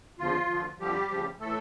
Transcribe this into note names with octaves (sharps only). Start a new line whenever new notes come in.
E2 D3 F3 F4
D2 D3 F3
F2 D3 F3 G3 G4
D2 C#3 F3
A2 E3 A3 A4